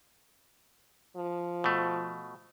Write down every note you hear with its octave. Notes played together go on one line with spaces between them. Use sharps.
F3
B2 A3